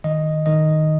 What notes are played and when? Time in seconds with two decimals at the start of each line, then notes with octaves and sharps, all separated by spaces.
0.04 D#3 D#5
0.46 D#3 D#5